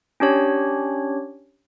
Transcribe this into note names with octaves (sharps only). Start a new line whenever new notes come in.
C#4 D4 G4 C#5